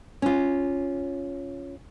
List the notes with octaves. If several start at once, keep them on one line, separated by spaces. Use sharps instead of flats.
C#4 F4